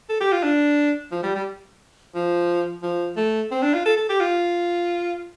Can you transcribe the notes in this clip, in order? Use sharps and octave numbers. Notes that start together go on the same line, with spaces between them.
A4
G4
F4
D4
F3
G3
G3
F3
F3
A3
C4
D4
F4
A4
A4
G4
F4